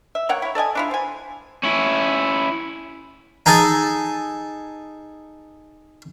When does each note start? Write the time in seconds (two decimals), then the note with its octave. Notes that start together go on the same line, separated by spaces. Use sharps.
0.15 E5
0.29 A#3 C#5 F#5 G5
0.42 E4 C#5
0.55 A4 D5 D#5 G#5
0.75 D4 E4 F4
0.91 C5 G#5
1.63 C#4 E4
3.46 D#4 G#4 A4 G#5